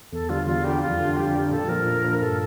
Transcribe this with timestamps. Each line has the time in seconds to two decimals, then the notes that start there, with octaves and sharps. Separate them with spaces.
0.13 E2 A4
0.29 D3 G3 F4
0.47 E2 F4
0.64 D3 G3 G4
0.82 F2 F4
0.99 D3 G3 D4
1.16 F2 G4
1.34 D3 G3 D4
1.51 A#2 A4
1.69 F3 A#3 D4 A#4
1.86 A#2
2.04 F3 A#3 D4
2.21 G2 A4